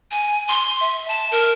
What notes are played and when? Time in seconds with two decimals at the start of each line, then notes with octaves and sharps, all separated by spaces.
0.11 G#5
0.48 C6
0.81 E5
1.08 A5
1.31 A#4